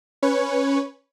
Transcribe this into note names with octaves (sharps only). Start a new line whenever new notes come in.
C#4 B4 C#5 C#6